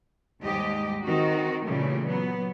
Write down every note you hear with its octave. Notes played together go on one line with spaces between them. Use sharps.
D#2 G#2 G3 G4 D#5
D#3 C4 D#4 F#4
A#2 C#3 E3 G3 A3
F#3 B3